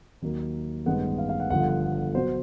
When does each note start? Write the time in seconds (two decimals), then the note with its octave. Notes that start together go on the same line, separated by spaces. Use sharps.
0.22 D#2 D#3 F#3 A#3
0.86 A1 G2 D#3 G#3 B3 F#5
1.18 F5
1.29 F5
1.40 F#5
1.50 G1 G2 D3 F3 F#5
1.60 F5
1.68 F#5
2.15 B2 F#3 C5